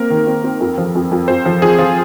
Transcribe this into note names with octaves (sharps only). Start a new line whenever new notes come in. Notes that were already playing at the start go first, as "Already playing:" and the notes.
Already playing: A#3 C4 A#4
D#3
C4
C4
F2
F3
F2
F2
F2 C5
F3
F3 G#4
F3 F4